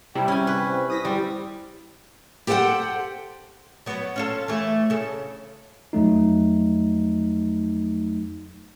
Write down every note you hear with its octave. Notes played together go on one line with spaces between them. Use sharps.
C3 G3 E4 G5
C#4 G#5
B4
C5
E4 D#6 A#6 B6
G3 C4
G4 A4 C5 D#5 F#5 G5
F#3 B3
C#4 F4 A4
E3 A3
C#3 A4
F2 F#3 A3 D#4